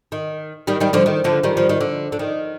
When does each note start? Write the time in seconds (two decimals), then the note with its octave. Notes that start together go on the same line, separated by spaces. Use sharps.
0.12 D#3
0.67 D#3 G3
0.80 D#3 G3
0.93 D3 F3
1.06 D#3
1.24 D3 F3
1.43 D#3 G3
1.57 F3
1.69 D#3
1.81 D3
2.12 D3
2.19 D#3